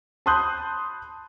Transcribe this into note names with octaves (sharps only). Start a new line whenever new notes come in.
A5 B5 C6 D#6 F#6 G6